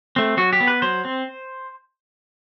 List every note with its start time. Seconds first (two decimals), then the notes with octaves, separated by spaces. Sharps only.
0.16 A3 C4
0.37 F#3 F#4
0.53 G4
0.60 B3
0.67 B4
0.82 F#3 C5
1.05 C4